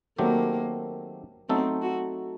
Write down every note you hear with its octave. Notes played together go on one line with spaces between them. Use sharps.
D#3 F#3 A3 A#3 C4 G4
F#3 A3 C4 D#4 A4
F#4